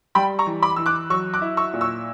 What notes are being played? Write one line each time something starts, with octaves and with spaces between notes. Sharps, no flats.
G3 G5 B5
A#5 C#6
E3
B5 D6
E3 E6
D6 F#6
F#3 C#6 E6
D6 F#6
E4
C#6 E6
A#2
C#6 E6